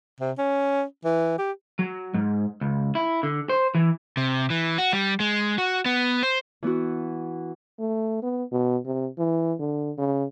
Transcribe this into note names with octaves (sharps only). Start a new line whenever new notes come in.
C3
C#4
E3
G4
F#3
G#2
C#2
E4
D3
C5
E3
C3
E3
F#4
G3
G#3
F#4
B3
C5
E3 B3 E4 F#4
A3
B3
B2
C3
E3
D3
C#3